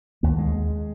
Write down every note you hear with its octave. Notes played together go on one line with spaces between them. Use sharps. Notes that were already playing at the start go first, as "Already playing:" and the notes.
D#2 A#3
G#3